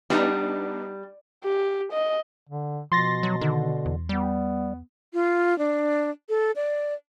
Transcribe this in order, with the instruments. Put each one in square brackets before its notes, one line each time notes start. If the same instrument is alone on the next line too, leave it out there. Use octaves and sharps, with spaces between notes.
[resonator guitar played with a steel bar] G3 [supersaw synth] B3 D4 D#4
[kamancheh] G4
D#5
[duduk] D3
[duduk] B2 [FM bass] F3 [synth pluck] C6 A6 A#6
[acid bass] F#3
[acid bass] D3 [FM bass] D#3
[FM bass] E2
[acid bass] G3 [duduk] B3
[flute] F4
D4
A4
D5